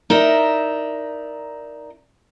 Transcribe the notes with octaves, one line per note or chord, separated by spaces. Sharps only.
D#4 A#4 D5 E5